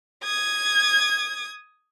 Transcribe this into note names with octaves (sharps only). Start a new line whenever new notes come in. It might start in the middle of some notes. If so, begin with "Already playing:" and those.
D#6 G#6